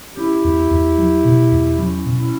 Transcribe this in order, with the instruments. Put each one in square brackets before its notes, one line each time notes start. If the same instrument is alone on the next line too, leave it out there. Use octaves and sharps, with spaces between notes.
[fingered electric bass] C#4 [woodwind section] E4 G4
[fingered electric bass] E2
E2
F#3
B2
E2
[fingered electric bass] F#3 [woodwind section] C#4 E4
[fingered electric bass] B2
[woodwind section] C#4 E4